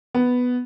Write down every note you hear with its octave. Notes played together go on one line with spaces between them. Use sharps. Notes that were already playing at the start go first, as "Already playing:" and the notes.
B3